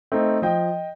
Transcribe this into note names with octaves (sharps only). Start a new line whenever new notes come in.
A3 C4 D#4
F3 D#5 G5